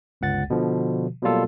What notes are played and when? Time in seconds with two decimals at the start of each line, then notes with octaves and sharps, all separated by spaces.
0.21 G1 C#2 F#5 A6
0.50 B2 D3 F3
1.22 B2 F#3 G3 A#3 F4 A4